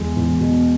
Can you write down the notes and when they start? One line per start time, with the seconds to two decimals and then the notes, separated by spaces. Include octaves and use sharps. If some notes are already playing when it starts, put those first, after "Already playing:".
Already playing: E2 G#3
0.17 E2
0.40 B2